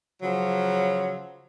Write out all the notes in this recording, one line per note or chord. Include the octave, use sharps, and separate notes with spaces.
C#3 F3 F#3